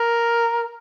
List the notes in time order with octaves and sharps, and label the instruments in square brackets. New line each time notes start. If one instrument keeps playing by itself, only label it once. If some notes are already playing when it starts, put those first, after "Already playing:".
Already playing: [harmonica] A#4